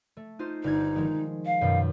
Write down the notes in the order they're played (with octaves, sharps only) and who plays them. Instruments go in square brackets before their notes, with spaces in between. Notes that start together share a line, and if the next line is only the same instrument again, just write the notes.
[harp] A3
D#4 F4 C5
[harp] G1 G#6 [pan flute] D#4
[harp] D#3 F3 G#3
[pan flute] F5
[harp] F#2 B2 D#3